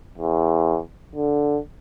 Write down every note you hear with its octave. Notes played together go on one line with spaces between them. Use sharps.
E2
D3